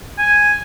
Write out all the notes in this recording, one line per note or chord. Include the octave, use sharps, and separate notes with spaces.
G#5